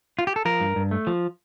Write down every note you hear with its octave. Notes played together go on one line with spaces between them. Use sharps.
F4
G4
A4
F3 A#4
G2
G2
A3
F3